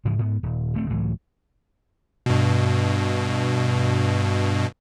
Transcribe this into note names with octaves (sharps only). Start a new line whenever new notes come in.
G#2 C#3 E3 F3
G#2 B3
D#1
D#1 A3 C4
C#2 A2 E3 F#3
G2 B2